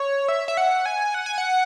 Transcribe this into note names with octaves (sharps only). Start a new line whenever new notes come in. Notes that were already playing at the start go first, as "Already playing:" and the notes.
Already playing: C#5
E5
E5
F#5
G#5
F#5
G#5
F#5